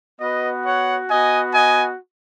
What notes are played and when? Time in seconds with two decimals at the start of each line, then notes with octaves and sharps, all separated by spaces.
0.20 B3 F#4 B4 D#5
0.65 C#5 F#5
1.09 B3 F#4 D#5 G#5
1.54 D#5 G#5